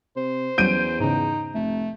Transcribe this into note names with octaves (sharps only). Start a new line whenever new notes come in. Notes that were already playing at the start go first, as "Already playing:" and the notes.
C3 C5
E2 F#3 G3 C#4 G6 D7 D#7
G#2 C#3 D#4
F1 A3